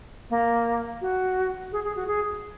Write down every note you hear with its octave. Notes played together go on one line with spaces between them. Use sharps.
A#3
F#4
G#4
G#4
F#4
G#4